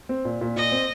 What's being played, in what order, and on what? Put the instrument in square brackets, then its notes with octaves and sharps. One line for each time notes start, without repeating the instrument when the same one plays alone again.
[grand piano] C4
A#2
A#2
[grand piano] A#2 [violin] D#5
[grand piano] C4